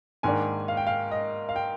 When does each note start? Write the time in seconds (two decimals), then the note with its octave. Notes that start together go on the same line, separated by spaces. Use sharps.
0.23 G#2 D#3 A#3 D4 G#5
0.68 F5
0.77 G5
0.87 F5
1.11 D#5
1.49 F5
1.56 G5